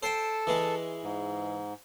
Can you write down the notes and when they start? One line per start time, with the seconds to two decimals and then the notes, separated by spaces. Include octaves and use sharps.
0.03 A4 C5 G5
0.47 E3 G#3
1.04 G#2